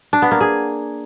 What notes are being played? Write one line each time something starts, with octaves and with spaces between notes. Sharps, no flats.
D4
B3
A#3
G#4